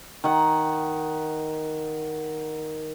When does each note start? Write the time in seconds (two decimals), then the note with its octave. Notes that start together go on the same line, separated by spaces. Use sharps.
0.24 D#3 F#5